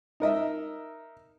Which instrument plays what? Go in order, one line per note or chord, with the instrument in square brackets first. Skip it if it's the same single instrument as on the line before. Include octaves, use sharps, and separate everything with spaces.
[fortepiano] D#4 A#4 D#5 E5